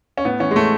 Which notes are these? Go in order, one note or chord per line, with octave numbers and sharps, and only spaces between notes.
C#4
A2 B3
E3 C#4
G#3
A2 A3